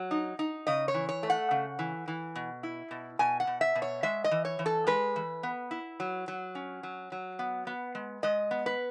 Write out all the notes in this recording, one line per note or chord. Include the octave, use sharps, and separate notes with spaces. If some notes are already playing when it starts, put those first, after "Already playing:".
Already playing: F#3
D#4
D#4
C#3 D#5
C#5
E3
C#5
A3
F#5
C#3
E3
E3
B2
E4
B2
B2 G#5
F#5
B2
E5
B2
C#5
G#3 E5
D#5
E3
C#5
E3
A4
G#3 B4
E3
B3
E4
F#3
F#3
C#4
F#3
F#3
B3
B3
G#3
G#3 D#5
B3
B4